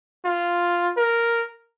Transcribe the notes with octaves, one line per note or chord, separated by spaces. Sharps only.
F4
A#4